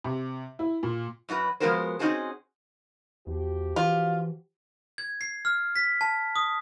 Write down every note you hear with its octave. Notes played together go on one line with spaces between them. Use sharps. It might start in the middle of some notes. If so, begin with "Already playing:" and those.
C3
E4
A#2
F#2 F#3 F#4 B4
F3 G#3 B3 F#4 A#4 C5
C4 C#4 D#4 F#4 G#4 C5
E2 F3 F#4 G4
E3 F4
G#6
C7
F6
B6
A5
D#6